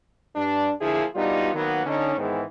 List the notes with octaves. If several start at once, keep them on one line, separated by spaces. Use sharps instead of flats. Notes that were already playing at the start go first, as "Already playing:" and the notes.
G2 D4
D3 F3 A#3 E4 G#4
G3 B3 D4 D#4 F4 F#4
D#3 F#3 A#3 B3
D3 C#4 D#4
G#2 D#3 E3 G#3 B3